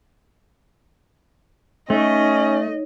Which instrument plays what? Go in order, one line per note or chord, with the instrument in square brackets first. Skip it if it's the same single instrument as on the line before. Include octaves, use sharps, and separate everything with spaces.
[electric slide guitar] A3 [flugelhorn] C#4 [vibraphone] D#4 C#5 [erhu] D#5